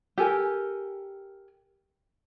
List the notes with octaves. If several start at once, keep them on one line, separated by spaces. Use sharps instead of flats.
G4 A4 A#4 G#5